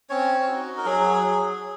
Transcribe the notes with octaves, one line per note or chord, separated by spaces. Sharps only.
C4 C#4 C#5
D#4 F#4
A#4
F#3 G#4